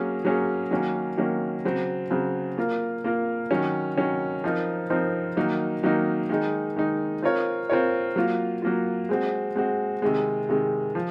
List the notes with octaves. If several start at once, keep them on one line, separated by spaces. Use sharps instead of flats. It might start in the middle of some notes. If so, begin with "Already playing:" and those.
Already playing: F#3 A#3 C#4 G#4
F#3 A#3 C#4 G#4
D#3 F#3 A#3 C#4
D#3 F#3 A#3 C#4
C#3 F#3 C4
C#3 F#3 C4
A#3 F4 A#4
A#3 F4 A#4
D#3 F#3 C#4
D#3 F#3 C#4
F3 C4 D#4 A#4
F3 C4 D#4 A#4
D#3 F#3 A#3 D#4
D#3 F#3 A#3 D#4
D#3 G#3 D#4
D#3 G#3 D#4
C4 F4 A#4 C#5
C4 F4 A#4 C#5
F#3 A#3 F4
F#3 A#3 F4
G#3 C4 F#4
G#3 C4 F#4
C3 D#3 G#3
C3 D#3 G#3
F3